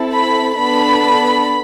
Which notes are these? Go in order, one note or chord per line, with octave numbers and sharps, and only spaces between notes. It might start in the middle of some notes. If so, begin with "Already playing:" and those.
Already playing: C4 E4 A4
B5
B3 D4 A4 B5